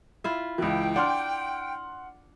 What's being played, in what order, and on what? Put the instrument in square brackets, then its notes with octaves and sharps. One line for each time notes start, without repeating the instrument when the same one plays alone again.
[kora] E4 F4 E5
[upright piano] C#2 E3 [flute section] G5
[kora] D4 [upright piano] F#5 C6 F6